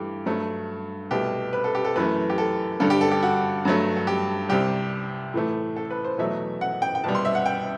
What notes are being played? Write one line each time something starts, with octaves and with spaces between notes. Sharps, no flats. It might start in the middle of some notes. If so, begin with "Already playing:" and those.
Already playing: G2 E3 A3 G4
G2 F#3 A3
C2 B2 A3 G4
B4
A4
G4
A4
F#2 E3 A3 B4
G4
A4
G2 D3 G3 A4
G4
A4
G4
F#4
G2 F#3 A3
A4
G4
C2 C3 G3 G4
A2 E3 A3
A4
B4
C5
E2 B2 F#3 A3 E5
F#5
G5
G5
C2 B2 G3 A5
C6
E5
F#5
G5